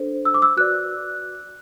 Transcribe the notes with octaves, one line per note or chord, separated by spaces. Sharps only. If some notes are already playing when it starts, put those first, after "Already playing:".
Already playing: D4 A4 C5
E6
D6
E6
F#4 B4 D5 F#6